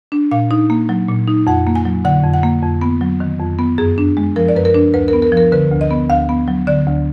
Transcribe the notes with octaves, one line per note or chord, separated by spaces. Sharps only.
D4
A#2 F5
D#4
A#3
F#3
A#2
D#4
F2 F#5
A#3
G#5
F#3
D3 F#5
F2
F#5
A#3
F2
B3
F#3
D#3
F2
B3
F#2 G#4
D4
G#3
F3 A#4
D5
F#2 B4
A#4
D4
D2 B4
A#4
B3
A#4
F3
A#4
D3 B4
D2
D#5
B3
D2 F5
B3
F#3
D3 D5
D2